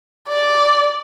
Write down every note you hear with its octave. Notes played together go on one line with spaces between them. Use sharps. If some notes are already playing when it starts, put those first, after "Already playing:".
D5